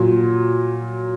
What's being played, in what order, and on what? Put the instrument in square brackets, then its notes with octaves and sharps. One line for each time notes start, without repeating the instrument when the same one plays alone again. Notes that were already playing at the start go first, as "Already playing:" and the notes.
Already playing: [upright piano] A#2 F#3